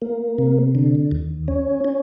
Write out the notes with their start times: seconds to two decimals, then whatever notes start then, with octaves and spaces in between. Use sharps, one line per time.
0.02 A#3
0.38 C3
0.75 D3
1.11 D#2
1.48 C#4
1.84 C#4